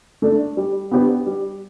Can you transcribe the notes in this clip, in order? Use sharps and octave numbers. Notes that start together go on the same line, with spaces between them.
A3 D4
G3
B3 D4 G4 B4
G3